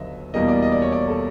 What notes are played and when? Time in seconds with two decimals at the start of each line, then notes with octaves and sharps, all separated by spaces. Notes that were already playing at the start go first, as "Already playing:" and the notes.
Already playing: D#2 D3 F#3 B3 D#5 E5
0.34 E2 B2 G3 A#3 D#5
0.48 D5
0.62 D#5
0.72 D5
0.82 C#5
0.92 D5
1.08 A4